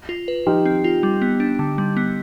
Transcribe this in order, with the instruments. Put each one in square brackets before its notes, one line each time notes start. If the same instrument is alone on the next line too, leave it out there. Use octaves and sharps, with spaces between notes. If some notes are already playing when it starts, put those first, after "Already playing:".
[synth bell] F4
B4
[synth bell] F3 [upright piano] D#4 G4
[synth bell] C4
F4
G3
B3
D4
D3
G3
B3